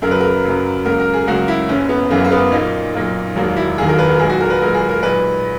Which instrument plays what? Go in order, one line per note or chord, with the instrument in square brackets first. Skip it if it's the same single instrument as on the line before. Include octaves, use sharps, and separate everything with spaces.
[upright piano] F#2 C#3 F#3 A#3 A#4
B4
A#4
F#2 C#3 F#3 A#3
C#2 C#3 F#3 A#3 A#4
A#4
G#4
C#2 C#3 F#3 A#3 F#4
E4
F#1 F#2 E3 C#4
B3
F#1 F#2 E3 A#3
A#3
B3
B1 A#2 A#3 D#4
B1 A#2 A#3
E1 D#2 D#3 F#3 A#3
E4
E1 D#2 D#3 F#3 A#3 G#4
A#4
B4
A#4
B1 A#2 G#3 G#4
F#4
A#4
B4
B1 A#2 G#3 A#4
G#4
A#4
B1 A#2 G#3 B4